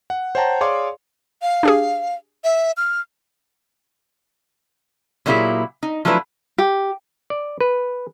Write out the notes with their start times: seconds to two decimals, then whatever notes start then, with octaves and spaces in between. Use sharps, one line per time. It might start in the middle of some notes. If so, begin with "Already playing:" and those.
0.10 F#5
0.35 C5 C#5 F#5 G5 A5 A#5
0.61 G#4 C#5 D5 F5 C6 D6
1.42 F5
1.63 D4 G4 G#4
2.44 E5
2.77 F6
5.26 A#2 F#3 A#3 E4 G4 G#4
5.83 D#4
6.05 F3 F#3 A3 D4 E4 B4
6.58 G4
7.30 D5
7.61 B4